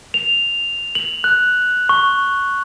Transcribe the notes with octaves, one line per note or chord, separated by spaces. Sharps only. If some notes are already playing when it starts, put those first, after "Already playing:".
F7
F#7
F#6
C#6